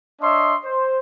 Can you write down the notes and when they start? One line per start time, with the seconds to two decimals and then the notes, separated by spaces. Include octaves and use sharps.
0.21 D4 C#5 D#5 E5 C6
0.65 C5